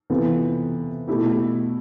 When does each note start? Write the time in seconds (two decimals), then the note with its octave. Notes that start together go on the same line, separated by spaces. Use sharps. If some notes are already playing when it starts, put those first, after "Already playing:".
0.10 C3 E3 B3 F4 A4
1.08 B2 A3 E4 G4